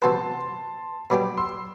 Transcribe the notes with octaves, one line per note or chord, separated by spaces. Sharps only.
C3 E3 B3 F#4 B4 A5 C6
B2 F#3 B3 D4 G4 B5 D6
C6 E6